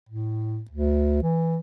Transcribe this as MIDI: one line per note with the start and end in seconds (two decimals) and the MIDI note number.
0.09 0.61 45
0.71 1.22 38
1.23 1.58 52